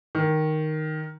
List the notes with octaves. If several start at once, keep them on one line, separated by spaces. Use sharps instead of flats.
D#3